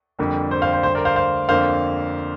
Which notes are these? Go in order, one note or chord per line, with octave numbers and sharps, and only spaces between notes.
F2 D3 G3 A#3
C5
C5 F5
C5
D2 D3 G3 C5
A#4 D5
C5 F5
C5 F5
F2 D3 A#3 C5 F5